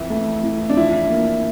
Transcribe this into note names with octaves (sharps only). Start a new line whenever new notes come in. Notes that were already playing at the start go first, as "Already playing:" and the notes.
Already playing: F2 E3 E4
A3
E3
D4
F3 E4
A#3